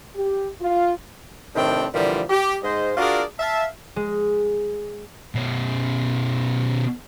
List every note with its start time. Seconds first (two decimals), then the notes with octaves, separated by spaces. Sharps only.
0.16 G4
0.62 F4
1.55 A2 C3 D#3 C4 D4 G5
1.94 A#2 D3 E3 F3 G3 A#3
2.30 G4
2.63 G#2 C5 D#5
2.97 D4 F4 F#4 G#4 A#4 D5
3.39 E5 F5 A5
3.96 G#3
5.35 B2 C#4